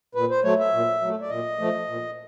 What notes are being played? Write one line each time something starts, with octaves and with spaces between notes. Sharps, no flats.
A#2 B4
C5
F#3 A3 C#5
E5
A#2
F#3 A3
D5
A#2 D#5
F3 A3
A#2